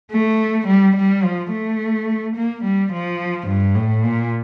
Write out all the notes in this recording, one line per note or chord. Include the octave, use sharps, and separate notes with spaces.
A3
G3
G3
F3
A3
A#3
G3
F3
G2
A2
A#2